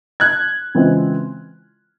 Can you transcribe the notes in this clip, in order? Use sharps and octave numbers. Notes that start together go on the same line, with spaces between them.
F#6 G#6
C#3 E3 G#3 C4 F4